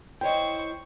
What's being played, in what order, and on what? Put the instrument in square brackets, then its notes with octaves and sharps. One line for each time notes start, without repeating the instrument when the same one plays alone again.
[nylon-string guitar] E4 C#5 D#5 [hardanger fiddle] C5 C#6 [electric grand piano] G5